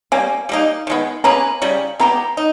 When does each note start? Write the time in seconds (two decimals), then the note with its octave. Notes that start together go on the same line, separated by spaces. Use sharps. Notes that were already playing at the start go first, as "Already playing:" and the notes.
0.12 G3 A#3 C#4 G#5
0.49 G3 A#3 D#4
0.87 D#3 G#3 B3
1.24 A#3 C#4 G#4 B4 A#5
1.62 C#3 G3 C#4
2.00 G#3 B3 G4 A#5
2.37 D#4